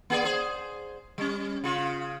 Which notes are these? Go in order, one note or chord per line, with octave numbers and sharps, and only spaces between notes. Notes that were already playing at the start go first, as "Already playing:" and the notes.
A#3 G#4 D5
G#4 C5
G3 C#4
C#3 F4